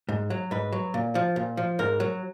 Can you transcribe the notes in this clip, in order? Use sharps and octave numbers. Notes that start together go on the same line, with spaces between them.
G#2
F#3
G#2 B4
F#3
A#2
F3
A#2
F3
G#2 A#4
F#3